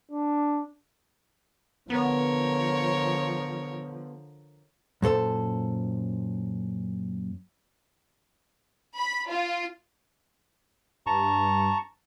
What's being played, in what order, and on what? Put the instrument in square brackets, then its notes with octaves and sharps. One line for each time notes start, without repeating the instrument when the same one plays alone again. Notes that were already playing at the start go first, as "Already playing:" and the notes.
[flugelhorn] D4
[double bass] D3 F3 [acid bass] B3 [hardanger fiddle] A#4 C#5
[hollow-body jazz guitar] F#2 A#2 A4 C5
[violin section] B5
F4
[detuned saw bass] G2 [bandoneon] A5 A#5 C#6